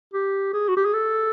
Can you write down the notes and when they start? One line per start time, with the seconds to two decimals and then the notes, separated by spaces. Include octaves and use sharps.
0.14 G4
0.53 G#4
0.68 F#4
0.77 G4
0.85 G#4
0.94 A4